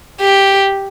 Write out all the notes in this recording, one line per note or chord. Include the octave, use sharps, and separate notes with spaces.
G4